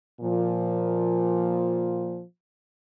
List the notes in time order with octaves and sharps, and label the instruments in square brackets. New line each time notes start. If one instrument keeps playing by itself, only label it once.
[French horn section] A#2 F3